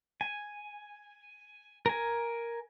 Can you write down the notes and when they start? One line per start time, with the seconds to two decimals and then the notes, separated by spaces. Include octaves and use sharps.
0.21 G#5
1.86 A#4 G#5